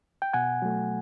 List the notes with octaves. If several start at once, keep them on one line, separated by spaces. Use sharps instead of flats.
G5
B2 F#5 G#5
F#3 A3